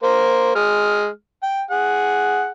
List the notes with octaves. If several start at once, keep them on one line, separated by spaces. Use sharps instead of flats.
A#3 A#4 C5
G#3 F6
G5
G#4 F#5